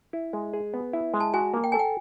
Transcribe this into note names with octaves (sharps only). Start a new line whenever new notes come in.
E4
G#3
G#4
B3
E4
G#3
A5
F#4 G#5
A#3
G5
A4 G#5
G5